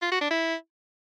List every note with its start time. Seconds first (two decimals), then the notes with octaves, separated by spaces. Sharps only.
0.02 F4
0.11 F#4
0.21 D4
0.31 E4